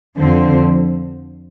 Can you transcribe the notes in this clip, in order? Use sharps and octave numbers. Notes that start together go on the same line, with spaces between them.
F2 D3 F3 C4